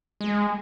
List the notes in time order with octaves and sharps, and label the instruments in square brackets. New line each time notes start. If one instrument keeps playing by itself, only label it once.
[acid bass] G#3